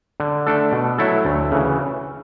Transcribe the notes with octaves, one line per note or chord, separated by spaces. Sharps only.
D3
A3 D4 A4
B2
F#3 A3 E4 A4
D2
C#3 E3